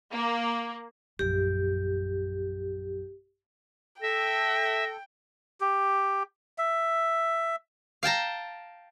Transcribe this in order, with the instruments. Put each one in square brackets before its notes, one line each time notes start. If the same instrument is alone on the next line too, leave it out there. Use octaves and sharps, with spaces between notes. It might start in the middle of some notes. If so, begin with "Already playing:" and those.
[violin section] A#3
[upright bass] A#1 F#2 [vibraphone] G4
[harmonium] A4 [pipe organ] E5 [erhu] G5 [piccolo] A#6
[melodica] G4
E5
[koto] F5 G5 A5 A#5